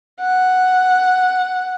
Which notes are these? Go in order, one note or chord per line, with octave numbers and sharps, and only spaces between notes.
F#5